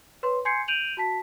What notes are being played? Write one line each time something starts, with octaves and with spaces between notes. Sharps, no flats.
B4 C#5 C6
G#5 C6 G6 G#6 C7 C#7
G6 D7 D#7 F7 F#7
F#4 A5 B6